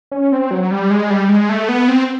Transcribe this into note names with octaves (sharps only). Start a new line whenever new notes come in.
C#4
C4
F#3
G3
G#3
G3
G#3
A3
B3
C4